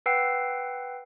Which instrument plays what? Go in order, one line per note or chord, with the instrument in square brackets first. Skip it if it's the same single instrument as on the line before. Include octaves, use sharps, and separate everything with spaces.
[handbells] B4 F#5 G5 E6 C7